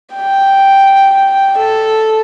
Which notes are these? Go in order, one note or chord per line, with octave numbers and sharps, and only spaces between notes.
G5
A4